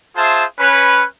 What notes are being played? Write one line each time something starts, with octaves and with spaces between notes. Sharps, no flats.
F4 G#4 C5 E5 A5
C#4 B4